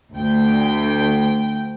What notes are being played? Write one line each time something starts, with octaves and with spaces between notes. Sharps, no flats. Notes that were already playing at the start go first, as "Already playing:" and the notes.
D2 G5